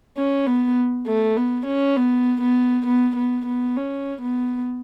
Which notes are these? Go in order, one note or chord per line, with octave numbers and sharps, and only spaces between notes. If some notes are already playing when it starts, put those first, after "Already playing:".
C#4
B3
A3
B3
C#4
B3
B3
B3
B3
B3
C#4
B3